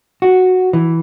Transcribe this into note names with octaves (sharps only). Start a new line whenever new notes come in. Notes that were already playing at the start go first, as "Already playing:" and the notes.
F#4
E3